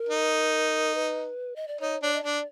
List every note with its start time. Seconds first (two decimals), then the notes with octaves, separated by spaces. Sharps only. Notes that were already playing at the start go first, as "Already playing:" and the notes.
Already playing: A#4
0.09 D#4
0.95 B4
1.56 D#5
1.68 D5
1.80 D#4 C#5
2.03 D4 C#5
2.14 D#5
2.23 D4 D5